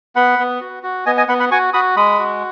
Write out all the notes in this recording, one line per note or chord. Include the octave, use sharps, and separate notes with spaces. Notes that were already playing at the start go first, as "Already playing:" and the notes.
B3 F#5 B5
B3
F#4
F#4
B3 D#5 G#5
D#5 G#5
B3 F#5 B5
F#5 B5
F#4 G#5 C#6
F#4 B5 D#6
G#3 B5 D#6
F#4